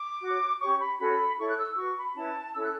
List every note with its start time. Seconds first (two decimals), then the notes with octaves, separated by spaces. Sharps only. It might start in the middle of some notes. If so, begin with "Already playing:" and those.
Already playing: D6
0.21 F#4
0.27 C#5
0.60 C#4 G4 C#5 C#6
0.79 B5
0.99 C#4 F#4 A4 C#5 B5
1.38 E4 A4 C#5 C#6
1.47 F#6
1.58 E6
1.76 F#4 B4 C#6
1.96 B5
2.15 C#4 E4 B4 A5
2.53 C#4 E4 A4 E6
2.63 F#6